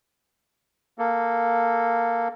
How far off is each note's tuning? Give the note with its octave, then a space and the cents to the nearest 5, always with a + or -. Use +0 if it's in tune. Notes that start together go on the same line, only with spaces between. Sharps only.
A#3 +0 A4 +5